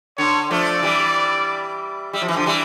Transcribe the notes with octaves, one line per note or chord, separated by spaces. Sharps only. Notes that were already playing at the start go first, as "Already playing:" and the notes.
D3 C#5
F3 A3 D5
E3 G3
G3 E5
F3
E3
D3 F3
E3 G3